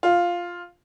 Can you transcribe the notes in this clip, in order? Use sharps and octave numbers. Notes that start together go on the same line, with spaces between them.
F4